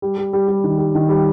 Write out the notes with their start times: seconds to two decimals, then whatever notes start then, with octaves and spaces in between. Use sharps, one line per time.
0.02 G3
0.17 G3
0.33 G3
0.48 G3
0.64 D#3
0.78 G3
0.95 D#3
1.09 G3